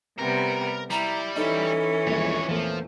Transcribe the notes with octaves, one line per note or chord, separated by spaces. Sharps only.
C3 G3 B3 A#4
G3 E4 A#5
E3 C#4 D#4 E4 A4
D#1 A#1 G2 G#3 C#5
E2 A#2 F3 A3